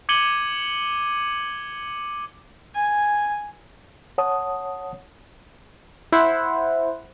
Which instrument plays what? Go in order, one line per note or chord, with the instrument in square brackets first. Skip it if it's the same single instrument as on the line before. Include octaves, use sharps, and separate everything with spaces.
[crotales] D6 G#6 C#7 D#7 F#7 G7
[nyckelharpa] G#5
[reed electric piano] C#5 F#5 A5 D#6
[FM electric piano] E4 C5 F#5